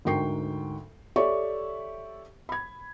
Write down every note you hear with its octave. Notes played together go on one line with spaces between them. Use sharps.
D2 G#2 A#4 G5 C#6 C7
G4 A4 C#5 D5 E5 C#6
B5 G#6